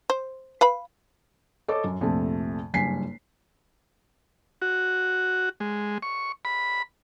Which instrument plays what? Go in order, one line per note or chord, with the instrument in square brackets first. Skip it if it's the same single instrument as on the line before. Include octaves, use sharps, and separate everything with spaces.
[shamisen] C5
B4 F5 B5
[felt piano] A4 C5 C#5 D#5 D6
F#2
A#1 F2 C3 A3
F#1 G2 G#5 B6 C7
[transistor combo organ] F#4
G#3
C#6
B5